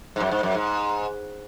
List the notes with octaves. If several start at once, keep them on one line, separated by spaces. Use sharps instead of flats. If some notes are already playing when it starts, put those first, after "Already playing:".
G#2
F#2
G#2
F#2
G#2